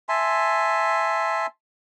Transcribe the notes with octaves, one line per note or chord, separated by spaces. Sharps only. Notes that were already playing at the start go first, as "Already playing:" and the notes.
E5 G#5 A5 C6